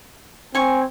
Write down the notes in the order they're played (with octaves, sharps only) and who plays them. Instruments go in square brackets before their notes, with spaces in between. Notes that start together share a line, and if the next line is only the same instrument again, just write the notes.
[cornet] C4 [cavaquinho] G#5 C#6